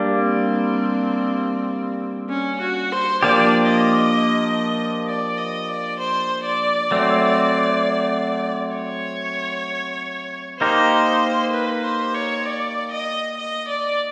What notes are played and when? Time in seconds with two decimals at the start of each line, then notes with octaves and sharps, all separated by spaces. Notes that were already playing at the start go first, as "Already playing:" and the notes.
Already playing: G3 A#3 D4
0.15 C4
2.30 C#4
2.61 F#4
2.92 C5
3.22 F3 A#3 D4 G4 D5
3.68 D#5
5.07 D5
5.38 D#5
5.69 D5
6.00 C5
6.45 D5
6.91 F#3 A3 C4
8.75 C#5
10.60 A#3 D#4 G4 A#4 C5
11.53 B4
11.84 C5
12.15 C#5
12.45 D5
12.91 D#5
13.37 D#5
13.68 D5